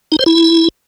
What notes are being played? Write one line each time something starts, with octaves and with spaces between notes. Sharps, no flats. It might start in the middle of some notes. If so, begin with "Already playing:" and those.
D#4
C5
E4